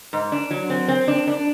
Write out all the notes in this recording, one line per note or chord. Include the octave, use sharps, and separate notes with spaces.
G#2
D4
F#3
C4
C4
D4
D4